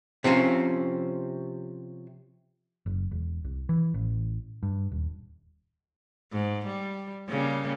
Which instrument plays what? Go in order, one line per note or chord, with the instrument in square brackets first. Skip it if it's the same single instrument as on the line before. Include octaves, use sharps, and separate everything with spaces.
[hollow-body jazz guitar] C3 F3 C4 C#4
[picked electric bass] F#1
E1
C2
E3
A1
G2
D#1
[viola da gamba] G#2
G3
C#3 G3 A#3